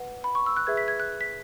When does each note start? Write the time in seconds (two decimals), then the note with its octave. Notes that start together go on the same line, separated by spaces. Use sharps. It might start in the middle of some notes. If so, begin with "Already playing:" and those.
Already playing: B4 F#5
0.24 B5
0.35 C#6
0.46 E6
0.57 F#6
0.67 G#4 B4 E5 G#6
0.77 B6
0.88 G#6
1.00 F#6
1.21 B6